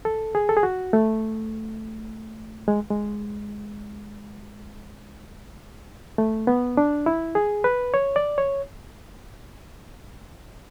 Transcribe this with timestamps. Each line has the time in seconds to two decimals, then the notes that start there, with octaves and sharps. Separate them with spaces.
0.05 A4
0.35 G#4
0.49 A4
0.57 G#4
0.63 F#4
0.93 A3
2.68 G#3
2.91 G#3
6.18 A3
6.47 B3
6.77 D4
7.06 E4
7.35 G#4
7.64 B4
7.94 C#5
8.16 D5
8.38 C#5